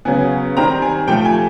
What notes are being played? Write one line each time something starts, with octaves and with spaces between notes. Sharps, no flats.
C#3 F#3 B3 G#5
D#3 G3 C4 A#5
G#5
C3 F3 A3 G5
G#5